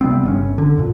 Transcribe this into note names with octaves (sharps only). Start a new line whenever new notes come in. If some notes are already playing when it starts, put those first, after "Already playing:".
C3 G3 B3 C4
G1 D3 C#4
D3
F2 A#2